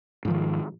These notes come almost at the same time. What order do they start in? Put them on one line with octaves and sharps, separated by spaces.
G#2 F3 D#3